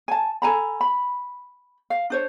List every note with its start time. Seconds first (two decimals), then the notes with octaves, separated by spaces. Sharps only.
0.08 G#5 A5
0.42 A4 G#5 A#5 B5
0.81 B5
1.90 F5
2.10 D4 C5 C#5